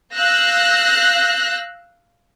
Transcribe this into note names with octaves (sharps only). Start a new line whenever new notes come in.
F5 E6 F#6 G6 A#6